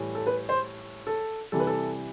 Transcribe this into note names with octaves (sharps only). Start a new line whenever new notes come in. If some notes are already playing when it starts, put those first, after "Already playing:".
Already playing: A2 E3 G3
A4
B4
C5
A4
C3 E3 G3 A4
B4
A4